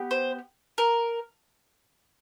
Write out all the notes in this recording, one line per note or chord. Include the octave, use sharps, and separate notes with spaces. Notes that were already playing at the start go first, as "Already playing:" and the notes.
Already playing: B3 G4
C5
A#4